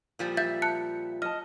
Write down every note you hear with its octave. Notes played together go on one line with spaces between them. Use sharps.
A#2 F3 G3
E5 G6 A6
A5 F#6 C#7
D#5 A5 F6